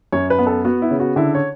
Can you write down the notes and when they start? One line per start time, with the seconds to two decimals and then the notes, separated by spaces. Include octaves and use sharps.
0.12 F#2 C#5
0.30 B4
0.38 B3
0.47 A4
0.65 B3 F#4
0.82 E4
0.91 C#3
1.00 F#4
1.16 D3 E4
1.35 C#5